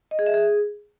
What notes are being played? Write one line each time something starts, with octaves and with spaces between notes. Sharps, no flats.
D#5
G#4
E5
G#4